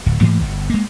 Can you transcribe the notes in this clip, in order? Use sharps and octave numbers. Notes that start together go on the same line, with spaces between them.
D1
G#2 E3 A3 A#3
G1
G#3 A#3